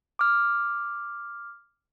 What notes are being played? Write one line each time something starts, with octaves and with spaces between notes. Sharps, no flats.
D6 F6